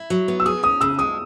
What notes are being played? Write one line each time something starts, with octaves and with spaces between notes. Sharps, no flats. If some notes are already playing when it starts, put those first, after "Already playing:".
Already playing: E4
F#3
B3
E6
G#4 D#6
C#4 D#6
C#3 E6
G#3 D#6